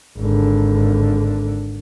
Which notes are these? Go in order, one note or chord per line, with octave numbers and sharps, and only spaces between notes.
G#1 D3